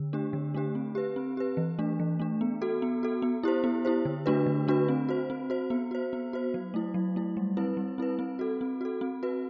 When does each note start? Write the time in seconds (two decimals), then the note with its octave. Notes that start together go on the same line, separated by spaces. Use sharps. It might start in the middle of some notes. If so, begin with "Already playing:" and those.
Already playing: D3
0.13 A3 D4 G4
0.33 D3
0.55 A3 D4 G4
0.75 C4
0.95 G4 B4
1.16 C4
1.37 G4 B4
1.57 E3
1.79 A3 D4
2.00 E3
2.20 A3 D4
2.41 B3
2.62 F#4 A4
2.82 B3
3.03 F#4 A4
3.22 B3
3.43 E4 G4 C5
3.64 B3
3.85 E4 G4 C5
4.05 D3
4.26 A3 D4 F#4 B4
4.46 D3
4.68 A3 D4 F#4 B4
4.88 C4
5.09 F#4 C5
5.30 C4
5.50 F#4 C5
5.70 B3
5.91 F#4 C5
6.13 B3
6.33 F#4 C5
6.54 F#3
6.74 A3 E4
6.94 F#3
7.16 A3 E4
7.37 G3
7.57 C4 E4 B4
7.77 G3
7.98 C4 E4 B4
8.19 C4
8.39 F#4 A4
8.61 C4
8.81 F#4 A4
9.01 C4
9.23 F#4 B4